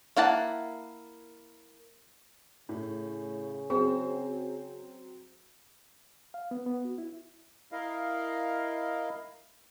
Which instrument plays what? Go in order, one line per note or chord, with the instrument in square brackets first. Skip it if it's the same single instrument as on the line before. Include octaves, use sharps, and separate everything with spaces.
[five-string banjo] A#3 E4 F#5 A5
[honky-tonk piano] A2 [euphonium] C#3
[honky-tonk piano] F#3 C4 [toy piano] G#4
[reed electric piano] F5
B3
B3
F#4
E4
[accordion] E4 A#4 D#5 F5